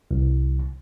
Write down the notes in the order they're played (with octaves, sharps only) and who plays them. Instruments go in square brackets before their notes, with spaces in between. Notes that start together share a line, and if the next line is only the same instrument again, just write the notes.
[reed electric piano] C2